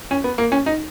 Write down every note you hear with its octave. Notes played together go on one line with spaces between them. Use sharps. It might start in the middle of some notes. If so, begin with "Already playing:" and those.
C#4
B3
A#3
C#4
D#4